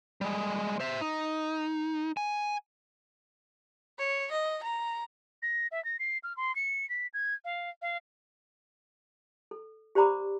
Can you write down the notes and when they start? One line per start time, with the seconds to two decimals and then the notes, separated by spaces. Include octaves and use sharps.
0.21 G3 G#3
0.80 C5 E5
1.01 D#4
2.17 G#5
3.99 C#5
4.32 D#5
4.63 A#5
5.42 A#6
5.71 E5
5.84 A#6
5.99 C7
6.23 F6
6.37 C6
6.55 C#7
6.89 B6
7.14 G#6
7.45 F5
7.82 F5
9.51 A4
9.95 G4 C5 D5 A#5 B5 D6